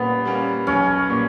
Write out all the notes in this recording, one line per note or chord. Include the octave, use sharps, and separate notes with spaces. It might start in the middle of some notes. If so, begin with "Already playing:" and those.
Already playing: A#2 G3 A#3 B3 C#4
G3 A#3 C#4
B1 C#4
A#2 G3 A#3